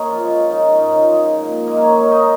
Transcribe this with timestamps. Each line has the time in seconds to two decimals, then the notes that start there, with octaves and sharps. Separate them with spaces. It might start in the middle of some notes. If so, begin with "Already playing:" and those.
Already playing: A#3 C#4 G#4 A#4 C#5 D#5 F5
0.10 F3 F4
0.20 G#3
0.30 C#4
0.49 D#3 D#4
0.65 C#4
0.78 G#2 D#4
0.93 F3 F4
1.08 F3 G#3 G#4
1.37 A#2
1.67 G#3 A#3 A#4
1.81 C#4 C#5
1.95 G#3 C#4 C#5
2.11 D#4 D#5